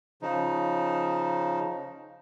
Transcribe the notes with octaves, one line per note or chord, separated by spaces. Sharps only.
C#3 F3 D#4